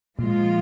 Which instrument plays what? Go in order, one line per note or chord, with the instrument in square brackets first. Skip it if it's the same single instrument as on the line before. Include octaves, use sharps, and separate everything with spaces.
[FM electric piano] A#2 [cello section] F3 G#3 F4